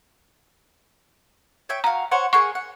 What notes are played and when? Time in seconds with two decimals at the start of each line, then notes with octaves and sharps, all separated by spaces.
1.69 C#5 E5 G5
1.84 F#4 F5 A#5
2.12 C5 C#5 F#5
2.33 G#4 A#4 F#5 C#6
2.55 F#5